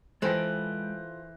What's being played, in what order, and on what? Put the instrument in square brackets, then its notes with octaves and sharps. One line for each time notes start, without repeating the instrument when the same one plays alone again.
[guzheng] E3 [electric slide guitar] G#3 B4 G5 [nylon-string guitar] F4 A4 [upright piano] C5 A#6